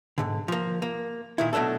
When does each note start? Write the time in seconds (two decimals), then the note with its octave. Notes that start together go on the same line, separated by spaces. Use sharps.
0.18 B1 G#2 D3
0.48 F3 A#3
0.82 A#3
1.38 A#2 D#3 E4
1.53 B2 F#3 A3 D4 A4